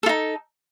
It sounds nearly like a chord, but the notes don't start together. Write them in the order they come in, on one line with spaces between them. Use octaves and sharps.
A4 F4 D#4